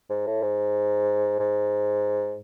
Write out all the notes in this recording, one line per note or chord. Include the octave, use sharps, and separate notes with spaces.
G#2
A2
G#2
G#2